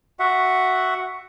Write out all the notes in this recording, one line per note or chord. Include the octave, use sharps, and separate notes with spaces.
F#4 E5 F#5